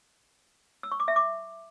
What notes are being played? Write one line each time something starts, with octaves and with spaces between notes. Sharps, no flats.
E6
C#6
D6
E5
D6